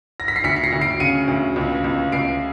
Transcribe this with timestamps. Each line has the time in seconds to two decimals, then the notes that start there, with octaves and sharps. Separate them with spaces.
0.20 A#6
0.28 B6
0.36 C7
0.44 D2 B6 C#7
0.56 C#7
0.63 A#6 C7
0.72 D2
0.81 C7 D7
1.00 C#3 C#7 D#7
1.28 D2
1.56 C#2
1.84 C#2
2.12 C#2 C7 D7